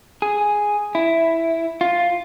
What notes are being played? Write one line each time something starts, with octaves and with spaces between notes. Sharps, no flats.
G#4
E4
F4